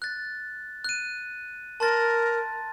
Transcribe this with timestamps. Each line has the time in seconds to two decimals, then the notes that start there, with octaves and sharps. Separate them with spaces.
0.02 F#6 A6
0.84 F#6 D#7
1.80 A#4 A5 C6 A6